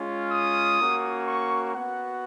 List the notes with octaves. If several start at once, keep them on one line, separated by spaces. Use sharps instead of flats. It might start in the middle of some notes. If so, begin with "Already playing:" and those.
Already playing: G#3 C#4 F4
D#6
A#3 C#4 F#4
C#6
B3 F#4 F#5